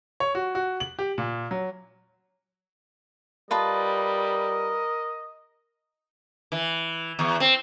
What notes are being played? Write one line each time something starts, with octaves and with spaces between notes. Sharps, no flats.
C#5
F#4
F#4
F#7
G4
A#2
F#3
G3 F4 A#4 B4 D#5 A5
E3
E2
C4